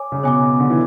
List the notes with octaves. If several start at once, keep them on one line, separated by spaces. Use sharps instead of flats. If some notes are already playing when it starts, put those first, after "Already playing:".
Already playing: C#5 G#5 D6
C#3
B2 C#5 G#5 D6
B2
D3
E3